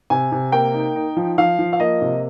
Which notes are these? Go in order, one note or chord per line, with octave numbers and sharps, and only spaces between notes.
C3 G#5
C3
A#3 G5
D#4
D#4
F3
F3 F5
F3
F5
A#3 D#5
C3